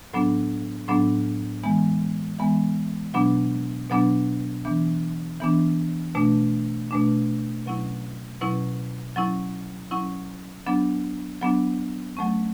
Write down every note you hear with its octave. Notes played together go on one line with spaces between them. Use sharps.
A2 F#3 B3 D4
A2 F#3 B3 D4
E3 G#3 B3
E3 G#3 B3
B2 F#3 B3 D4
B2 F#3 B3 D4
E3 B3 D4
E3 B3 D4
B2 A3 D4
B2 A3 D4
B2 F#3 C#4 E4
B2 F#3 C#4 E4
F#3 C#4 E4
F#3 C#4 E4
F#3 B3 D4
F#3 B3 D4
F#3 A3 C#4